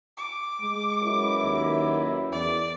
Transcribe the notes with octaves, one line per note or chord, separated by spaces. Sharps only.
D6
G#3
F#2 B2 E4
D#2
E2 D5